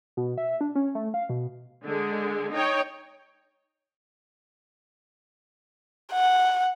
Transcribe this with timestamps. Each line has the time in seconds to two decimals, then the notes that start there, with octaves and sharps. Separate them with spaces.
0.17 B2
0.38 E5
0.61 D4
0.75 C#4
0.95 A3
1.14 F5
1.29 B2
1.84 D3 G#3
2.53 D#4 C#5 G5
6.13 F#5